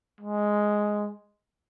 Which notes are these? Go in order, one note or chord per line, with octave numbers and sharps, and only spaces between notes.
G#3